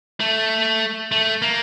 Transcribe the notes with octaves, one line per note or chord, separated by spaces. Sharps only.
A3
A3
A#3